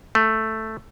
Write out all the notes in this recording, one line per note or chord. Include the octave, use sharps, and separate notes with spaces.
A3